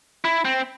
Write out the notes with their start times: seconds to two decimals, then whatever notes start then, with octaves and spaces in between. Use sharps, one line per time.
0.25 E4
0.45 C4